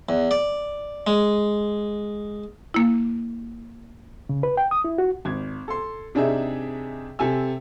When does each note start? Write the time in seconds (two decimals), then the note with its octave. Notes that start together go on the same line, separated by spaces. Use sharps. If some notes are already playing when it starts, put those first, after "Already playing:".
0.09 E2
0.31 D5
1.07 G#3
2.74 A#3 E4
4.29 C#3
4.43 B4
4.57 G5
4.71 D#6
4.84 E4
4.98 F#4
5.25 G#1 G#6
5.68 A4 C6
6.15 C3 D4 D#4 G#4 E5
7.19 C3 A4 G#5 E6